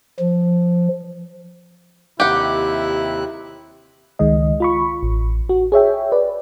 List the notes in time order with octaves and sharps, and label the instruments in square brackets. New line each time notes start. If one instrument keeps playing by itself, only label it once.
[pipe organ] F3
[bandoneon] D#2 C3 F#6 [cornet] E4 [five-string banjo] G4 F#5
[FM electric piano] C#2 D#3 G#3 D#5
F4 B5 C#6
A1
F#4
G#4 C#5 E5 G5
B4 D5